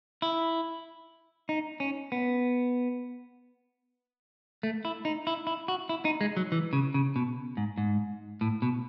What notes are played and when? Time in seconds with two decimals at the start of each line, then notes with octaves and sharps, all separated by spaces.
0.22 E4
1.49 D#4
1.80 C#4
2.12 B3
4.63 A3
4.85 E4
5.05 D#4
5.27 E4
5.47 E4
5.68 F#4
5.89 E4
6.05 D#4
6.21 G#3
6.37 F#3
6.52 E3
6.73 C#3
6.94 C#3
7.16 B2
7.57 G#2
7.78 G#2
8.41 A2
8.62 B2